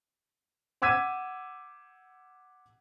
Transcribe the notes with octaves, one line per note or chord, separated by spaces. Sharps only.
F#5 D6 E6 G#6 B6 D#7